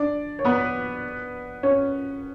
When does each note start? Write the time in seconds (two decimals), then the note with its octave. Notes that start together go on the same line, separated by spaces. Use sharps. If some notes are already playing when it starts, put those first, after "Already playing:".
Already playing: D4 D5
0.39 C#5
0.45 B3 B4
1.63 C#4 C#5